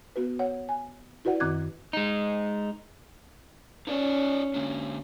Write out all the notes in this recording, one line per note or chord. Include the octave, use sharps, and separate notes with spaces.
B3 F#4 B4
C#5 F#5
G#5
E4 F#4 B4 D5 F#5
F#2 D#3 C4 D6 F#6 G#6
G#3 D#4
C#4 D#4 F4 D5
D3 A#3 D4